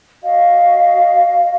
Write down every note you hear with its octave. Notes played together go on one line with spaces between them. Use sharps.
F#4 D#5 F5